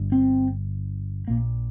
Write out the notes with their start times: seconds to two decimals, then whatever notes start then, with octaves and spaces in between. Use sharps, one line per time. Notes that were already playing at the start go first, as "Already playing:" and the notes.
Already playing: G1 G2
0.12 C4
1.28 A#1 A#2 A#3